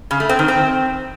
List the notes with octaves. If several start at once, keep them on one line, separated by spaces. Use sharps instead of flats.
C#3
A3
C4
D#3
C4